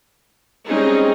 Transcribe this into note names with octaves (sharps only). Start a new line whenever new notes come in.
G3 G#3 C4 C#4 D#4